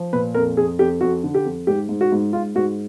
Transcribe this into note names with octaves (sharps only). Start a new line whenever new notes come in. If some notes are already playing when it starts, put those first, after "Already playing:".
Already playing: F3
A#2 B4
F2 A#4
F2 G#4
F2 G4
F2 F#4
D3
G4
F2
G#2 G4
G#2
F#4
G#2
G#2 F4
G#2 F#4